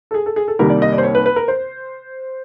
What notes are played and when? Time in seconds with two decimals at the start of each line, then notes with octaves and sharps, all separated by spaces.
0.11 A4
0.14 G#4
0.26 A4
0.36 G#4
0.48 A4
0.59 C2 C3 D#3 G3 A#3 A#4
0.70 D5
0.82 D#5
0.92 D5
0.98 C5
1.03 C#5
1.15 B4
1.26 B4
1.36 A#4
1.48 C5